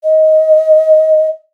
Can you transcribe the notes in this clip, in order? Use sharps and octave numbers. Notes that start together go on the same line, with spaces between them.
D#5